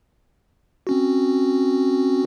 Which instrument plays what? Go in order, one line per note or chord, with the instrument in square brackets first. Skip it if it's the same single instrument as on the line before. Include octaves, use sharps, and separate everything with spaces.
[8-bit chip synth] C4 C#4 F#4